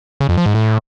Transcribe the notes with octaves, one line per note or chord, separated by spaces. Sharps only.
C#3
F2
F3
G#2
A2